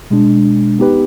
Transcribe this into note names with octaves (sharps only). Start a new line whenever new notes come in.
B2 G#3 D4
B3 D#4 G4 B4